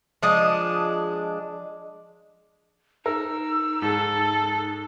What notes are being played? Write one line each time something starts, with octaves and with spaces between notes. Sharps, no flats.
F3 G#3 D4 D#5
D#4 A#4 E6
G#2 A4